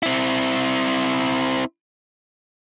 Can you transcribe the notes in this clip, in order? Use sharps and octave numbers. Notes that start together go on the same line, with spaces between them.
C4 E4